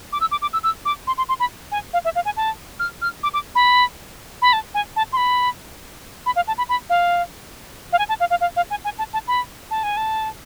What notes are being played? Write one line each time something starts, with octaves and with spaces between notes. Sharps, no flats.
D6
E6
D6
D6
E6
E6
D6
C6
C6
C6
B5
G#5
F5
E5
F5
G#5
A5
F6
F6
D6
D6
B5
B5
A5
G#5
A5
C6
B5
B5
F5
A5
B5
B5
F5
F5
G#5
A5
F5
F5
F5
F5
G#5
G#5
A5
A5
B5
A5
G#5
A5